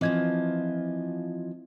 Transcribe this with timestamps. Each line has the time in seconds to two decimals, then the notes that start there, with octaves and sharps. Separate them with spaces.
0.01 E3 F3 C4 F4 D#5 G#6